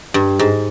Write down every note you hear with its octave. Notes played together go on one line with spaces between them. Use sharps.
G2
G#2